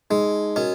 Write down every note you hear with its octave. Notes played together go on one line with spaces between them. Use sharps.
G#3 D#4
C#4 F#4 A#4 D#5